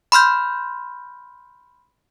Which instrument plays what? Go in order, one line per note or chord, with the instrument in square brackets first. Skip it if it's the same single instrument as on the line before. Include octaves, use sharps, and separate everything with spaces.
[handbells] B5 C6 F6 G6